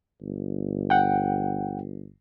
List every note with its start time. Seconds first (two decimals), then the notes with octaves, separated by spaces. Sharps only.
0.21 G1
0.90 F#5 G5